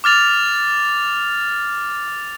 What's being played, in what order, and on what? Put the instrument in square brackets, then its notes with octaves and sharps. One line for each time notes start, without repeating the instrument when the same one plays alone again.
[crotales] D6 F6 A6 F7